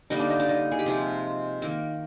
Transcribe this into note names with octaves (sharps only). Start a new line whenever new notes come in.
D3 G3 A#3 D#4
D4
D#4
D4
D#4
G#4
G4
C3 F3 G#3 F4
D#3 A#3